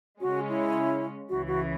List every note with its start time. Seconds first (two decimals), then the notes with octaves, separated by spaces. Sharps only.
0.21 C#3 G#3 C#4 F#4
0.49 E4
1.29 C#2 C#3 E3 F#4
1.47 F#4